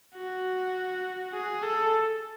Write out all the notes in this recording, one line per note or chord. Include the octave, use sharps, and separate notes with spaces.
F#4
G#4
A4